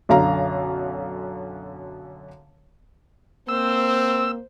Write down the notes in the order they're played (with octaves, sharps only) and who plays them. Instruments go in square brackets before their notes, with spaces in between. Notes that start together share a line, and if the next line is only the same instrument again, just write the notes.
[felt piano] B1 F#2 D3 F5 A#5
[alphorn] A#3 [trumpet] C4 [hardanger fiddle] C5 [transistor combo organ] E6